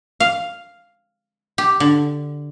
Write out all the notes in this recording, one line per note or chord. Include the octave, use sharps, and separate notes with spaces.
F5
G4
D3